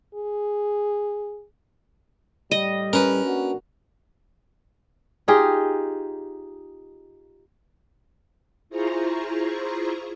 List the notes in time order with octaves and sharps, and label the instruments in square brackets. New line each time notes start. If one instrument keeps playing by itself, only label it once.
[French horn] G#4
[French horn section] A2 G3 [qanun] D#5
[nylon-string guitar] C#4 [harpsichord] A#4 B4
[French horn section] A#3 D4 F#4
[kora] D#4 F4 G4 G#4
[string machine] E4 F4 G#4 C5 A#5 C#6